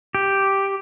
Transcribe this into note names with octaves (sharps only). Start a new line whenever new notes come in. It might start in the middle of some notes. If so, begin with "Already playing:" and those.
G4